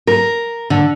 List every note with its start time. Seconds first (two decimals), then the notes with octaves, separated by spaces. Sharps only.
0.07 A#4
0.70 D3